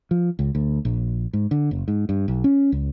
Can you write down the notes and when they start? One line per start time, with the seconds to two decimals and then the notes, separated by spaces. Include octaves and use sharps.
0.11 F3
0.39 C#2
0.55 D2
0.85 A#1
1.33 G#2
1.51 D3
1.71 F#1
1.88 G#2
2.09 G2
2.28 B1
2.44 C#4
2.72 C#2